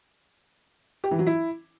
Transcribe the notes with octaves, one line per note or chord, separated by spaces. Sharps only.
G4
E3
F#3
E4